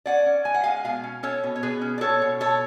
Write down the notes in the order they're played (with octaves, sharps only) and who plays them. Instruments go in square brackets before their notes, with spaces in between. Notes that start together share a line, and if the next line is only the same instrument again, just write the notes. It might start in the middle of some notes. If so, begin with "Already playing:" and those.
[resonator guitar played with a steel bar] C#4 D5 F#5
C#4
G#3 G#5
F#5
G#3 F5 G#5
B2 F5 G#5
C#4
C#4 A4 C#5
B2
C#5
B2 G#4 B4
C#4
D5
B2 A4 C#5
B2
B2 A4 C#5